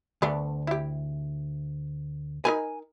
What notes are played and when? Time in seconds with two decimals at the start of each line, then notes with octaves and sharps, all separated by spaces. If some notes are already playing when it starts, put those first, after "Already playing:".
0.22 D2 A3 B3 D4
0.67 E4 G4
2.45 D#4 A#4 B4 G#5